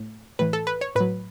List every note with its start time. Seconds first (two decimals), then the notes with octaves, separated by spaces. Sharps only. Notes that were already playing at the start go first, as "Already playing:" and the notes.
Already playing: A2
0.39 A2 E3 B4
0.53 A4
0.67 B4
0.81 C#5
0.95 A2 F#3 B4